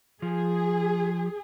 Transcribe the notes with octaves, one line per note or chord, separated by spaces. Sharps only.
F3 G#4